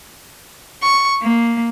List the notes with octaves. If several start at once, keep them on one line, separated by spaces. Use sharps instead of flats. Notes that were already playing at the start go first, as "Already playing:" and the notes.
C#6
A#3